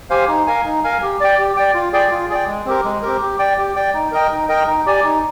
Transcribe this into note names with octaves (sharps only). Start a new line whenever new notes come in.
G4 C5 F5 G#5
D#4
A#4 F5 G#5
D#4
A#4 F5 G#5
G4
D5 G5
G4
D5 G5
F4
G#4 D5 G5
F4
G#4 D5 G5
G#3
C4 G4 A#4
G#3
C4 G4 A#4
G4
D5 G5
G4
D5 G5
D#4
A#4 D#5 G5
D#4
A#4 D#5 G5
D#4
G4 D5 G#5
D#4